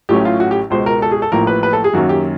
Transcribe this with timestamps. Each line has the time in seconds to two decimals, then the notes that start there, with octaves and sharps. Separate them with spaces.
0.09 A1 A2 F#3 A3 C#4 G4
0.25 F4
0.40 F#4
0.51 G4
0.70 C#2 B2 G#3 C5
0.86 A#4
1.02 A4
1.11 G#4
1.22 A4
1.32 A1 A2 F3 A#3 A#4
1.47 B4
1.63 B4
1.73 A4
1.84 G#4
1.93 F#2 D#3 F#3 A#3 C#4 F#4
2.09 G4